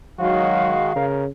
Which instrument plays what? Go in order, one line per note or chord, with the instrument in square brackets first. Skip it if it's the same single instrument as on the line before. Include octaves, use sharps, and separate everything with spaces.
[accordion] D#3 G#3 [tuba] F#3 [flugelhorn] F#4 [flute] F5
[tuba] C#3 [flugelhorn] A#4